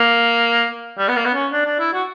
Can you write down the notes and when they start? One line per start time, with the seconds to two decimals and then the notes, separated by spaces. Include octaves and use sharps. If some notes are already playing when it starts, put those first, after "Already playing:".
Already playing: A#3
0.98 G3
1.08 B3
1.16 A#3
1.25 B3
1.34 C#4
1.52 D4
1.66 D4
1.79 E4
1.93 F#4